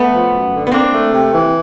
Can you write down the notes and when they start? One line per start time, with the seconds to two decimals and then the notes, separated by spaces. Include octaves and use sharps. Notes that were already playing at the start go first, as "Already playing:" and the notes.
Already playing: A3 B3
0.12 F3
0.32 F#2
0.52 D3
0.67 B3
0.72 A#3 C4 D4
0.92 A3
1.12 C3
1.32 E3